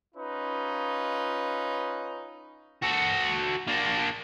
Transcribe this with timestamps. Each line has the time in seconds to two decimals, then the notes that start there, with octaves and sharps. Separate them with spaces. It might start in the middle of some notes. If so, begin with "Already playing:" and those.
0.15 C#4 D#4 F4 B4
2.83 F#4 A4
3.67 A#3 D4